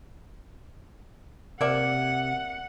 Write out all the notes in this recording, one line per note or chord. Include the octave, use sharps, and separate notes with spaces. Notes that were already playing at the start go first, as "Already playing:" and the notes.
C3 A#3 D5 E5 F#5